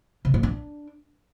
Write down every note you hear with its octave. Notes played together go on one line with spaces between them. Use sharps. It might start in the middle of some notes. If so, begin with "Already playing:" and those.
C3
A#2
D4